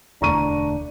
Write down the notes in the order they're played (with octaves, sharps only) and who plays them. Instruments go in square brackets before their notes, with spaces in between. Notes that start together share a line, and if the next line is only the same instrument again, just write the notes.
[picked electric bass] E1 D2 A3 [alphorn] D4 [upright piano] A#5 C#6 D#7